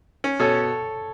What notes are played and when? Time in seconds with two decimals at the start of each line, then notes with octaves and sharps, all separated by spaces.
0.24 C#4
0.39 B2 A4 C#5